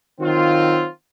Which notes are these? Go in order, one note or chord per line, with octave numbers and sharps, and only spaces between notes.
D#3 F#3 C4 F4